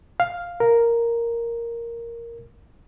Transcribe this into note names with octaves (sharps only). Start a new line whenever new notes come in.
F5
A#4